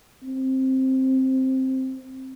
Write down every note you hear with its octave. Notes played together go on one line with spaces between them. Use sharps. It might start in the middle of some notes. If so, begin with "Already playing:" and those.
C4